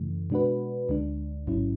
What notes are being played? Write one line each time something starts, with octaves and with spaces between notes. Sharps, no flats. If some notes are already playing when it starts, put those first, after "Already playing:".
Already playing: F#2 C#3 E3 A3
B2 G#3 D4 F#4 B4
D2 D3 G#3 D4
A1 G#2 F#3 C#4 E4